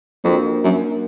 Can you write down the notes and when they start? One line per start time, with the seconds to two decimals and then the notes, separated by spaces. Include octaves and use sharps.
0.24 F2 A#3 D4 F#4 A#4
0.64 F#2